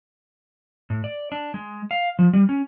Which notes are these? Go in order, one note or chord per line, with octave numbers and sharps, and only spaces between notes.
A2
D5
D4
G#3
F5
F3
G3
C#4